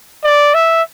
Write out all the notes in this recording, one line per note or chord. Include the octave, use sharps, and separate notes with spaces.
D5
E5